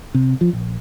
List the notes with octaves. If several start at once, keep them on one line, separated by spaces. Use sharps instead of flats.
C3
F3
A#1